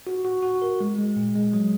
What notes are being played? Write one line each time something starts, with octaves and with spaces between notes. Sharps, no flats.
F#4
F#4
F#4
A#4
G#3
G#3
A#2
G#3
F#3